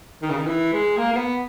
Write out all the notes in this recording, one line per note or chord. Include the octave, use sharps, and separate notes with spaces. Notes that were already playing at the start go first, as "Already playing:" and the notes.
D#3
C#3
D#3
E3
G#3
A#3
A#3
B3